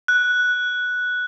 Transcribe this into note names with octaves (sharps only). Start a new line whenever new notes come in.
F#6